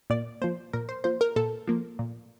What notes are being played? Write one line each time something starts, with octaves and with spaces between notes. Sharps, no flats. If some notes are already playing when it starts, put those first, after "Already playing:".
A#2 D5
F3 A#3 C5
A#2 A#4
C5
F3 A#3 C5
A#4
A#2 A4
F3 A#3
A#2